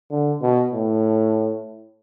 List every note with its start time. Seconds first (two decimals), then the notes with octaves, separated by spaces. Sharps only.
0.11 D3
0.42 B2
0.72 A2